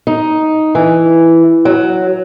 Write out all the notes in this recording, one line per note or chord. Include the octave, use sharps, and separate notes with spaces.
D#4
E3
F#3